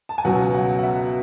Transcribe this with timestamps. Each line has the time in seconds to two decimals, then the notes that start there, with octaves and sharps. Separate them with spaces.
0.09 A5
0.18 G#5
0.24 C#2 B2 F#3 F#5
0.54 F#5
0.79 F#5
0.83 E5